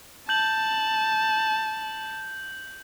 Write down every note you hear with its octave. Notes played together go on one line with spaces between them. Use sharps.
A5 G6 F#7